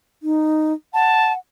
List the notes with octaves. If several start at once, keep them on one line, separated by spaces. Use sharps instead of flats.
D#4
F#5 A5